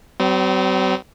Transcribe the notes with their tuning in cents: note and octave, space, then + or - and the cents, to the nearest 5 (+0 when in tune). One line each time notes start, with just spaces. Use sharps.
F#3 +45 C4 -30